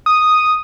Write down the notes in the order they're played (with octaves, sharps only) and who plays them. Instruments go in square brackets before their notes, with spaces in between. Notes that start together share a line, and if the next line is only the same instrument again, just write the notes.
[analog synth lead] D#6